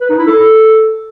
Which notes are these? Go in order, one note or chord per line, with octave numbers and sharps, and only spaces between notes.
B4
D#4
E4
A4